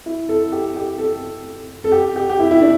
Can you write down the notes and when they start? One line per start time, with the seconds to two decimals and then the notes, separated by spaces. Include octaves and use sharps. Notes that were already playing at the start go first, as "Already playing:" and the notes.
0.06 E4
0.29 A4
0.52 G4
0.76 G4
0.98 A4
1.84 A4
1.92 G4
2.16 G4
2.29 G4
2.39 E4
2.51 E4
2.62 D4